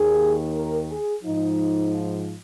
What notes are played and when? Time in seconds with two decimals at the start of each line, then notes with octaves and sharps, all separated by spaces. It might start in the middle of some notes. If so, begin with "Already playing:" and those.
Already playing: D#2 D#3 G#4
0.53 A#4
0.89 G#4
1.24 G#2 F3 D#4